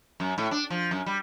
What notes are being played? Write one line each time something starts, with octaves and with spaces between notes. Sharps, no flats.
F#2
A2
D4
F3
F#2
G3